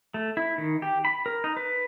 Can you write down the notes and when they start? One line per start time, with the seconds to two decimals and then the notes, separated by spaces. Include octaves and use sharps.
0.14 A3
0.37 E4
0.58 D#3
0.82 G4
1.05 B5
1.26 A#4
1.44 D#4
1.57 B4